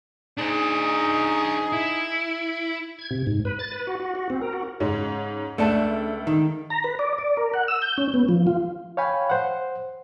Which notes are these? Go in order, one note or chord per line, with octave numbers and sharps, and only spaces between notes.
D4 D#4 G#4 C5
E4
G#6
C3
G#2
B4
A6
B4
F#4
F#4
F#4
C4
A#4
F#4
G#2 C#3 C#4
C#2 A3 D4 A4 E5
D#3
A#5
B4
D5
D5
A#4
F#5
E6
G6
C#4
B3
F3
F4
C#5 F5 G5 G#5 B5
C5 F#5